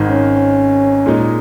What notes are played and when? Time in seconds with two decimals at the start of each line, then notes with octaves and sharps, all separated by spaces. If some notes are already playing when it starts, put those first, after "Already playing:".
Already playing: G#1 G#2 D#3
0.09 C#4
1.06 A#2 G#3 D#4